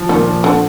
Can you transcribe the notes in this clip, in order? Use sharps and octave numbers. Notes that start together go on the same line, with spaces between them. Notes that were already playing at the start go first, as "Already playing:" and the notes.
Already playing: F3
A#2 D#3
F3
D3 C4